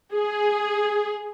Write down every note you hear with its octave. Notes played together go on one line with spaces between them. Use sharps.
G#4